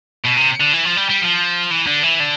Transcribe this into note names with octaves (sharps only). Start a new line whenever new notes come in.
B2
C3
D3
E3
F3
G3
G3
F3
E3
D3
E3
D3